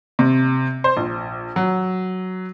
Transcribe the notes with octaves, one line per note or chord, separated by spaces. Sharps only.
C3
C5
A#1
F#3